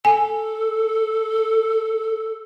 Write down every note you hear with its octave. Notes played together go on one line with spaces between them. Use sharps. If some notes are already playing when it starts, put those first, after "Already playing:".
A4 G#5